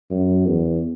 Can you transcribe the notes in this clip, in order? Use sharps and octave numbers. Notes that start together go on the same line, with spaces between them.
F#2
E2